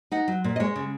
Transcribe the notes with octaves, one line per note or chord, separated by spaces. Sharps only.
D#4 F#5
F#3
A#2
D#5
G#3 C#5
C#3